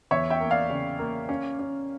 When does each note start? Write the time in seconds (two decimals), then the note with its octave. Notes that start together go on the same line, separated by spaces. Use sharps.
0.11 E2 C#5 E5
0.30 E5 G5
0.40 A#3
0.51 D5 F5
0.70 C#3
0.99 A#3
1.29 C#4
1.59 C#4